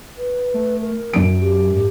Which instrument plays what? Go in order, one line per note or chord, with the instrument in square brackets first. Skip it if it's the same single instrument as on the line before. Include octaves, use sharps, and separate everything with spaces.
[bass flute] B4
[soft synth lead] A3
[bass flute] A#4
[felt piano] F#2 D7 [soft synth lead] F#3
[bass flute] G4
[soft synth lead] G#2